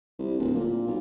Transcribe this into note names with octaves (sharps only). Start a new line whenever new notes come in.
C2
D1
A#2
B1